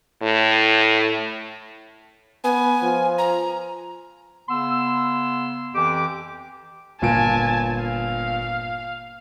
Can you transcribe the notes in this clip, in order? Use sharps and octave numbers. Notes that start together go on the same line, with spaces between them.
A2
B3 G#5
F3
A#5
C#3 B3 C6 E6
F2 E3 G4 D6
G1 A#2 G#5 A5 D7
F5